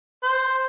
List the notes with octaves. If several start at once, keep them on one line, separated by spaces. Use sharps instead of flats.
C5